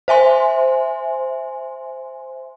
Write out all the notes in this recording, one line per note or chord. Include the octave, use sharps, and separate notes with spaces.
C5 E5 G#5 C6